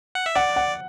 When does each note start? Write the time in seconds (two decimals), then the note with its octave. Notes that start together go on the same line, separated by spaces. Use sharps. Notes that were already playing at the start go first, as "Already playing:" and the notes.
0.15 F#5
0.26 E5
0.35 D5 F#5
0.56 F#5